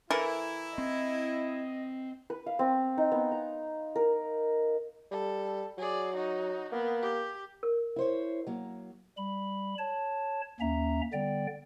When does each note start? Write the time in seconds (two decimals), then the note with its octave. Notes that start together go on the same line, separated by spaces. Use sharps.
0.11 E3 E4 A4 A#4
0.78 C4 D#5
2.30 B4
2.46 F5
2.59 C4
2.98 D#4
3.12 B3
3.31 A#5
3.96 A#4
5.11 G3 A4
5.78 F#3 G#4 D5
6.14 D#4 F#4
6.72 A#3 B3
7.02 G4
7.63 A#4
7.96 E4 C5 C#5
8.47 F#3 A#3
9.18 G3 B5
9.78 C#5 A5
10.60 D#2 A#3 C#4 E5 A#5
11.13 D3 G3 B3 D5 G5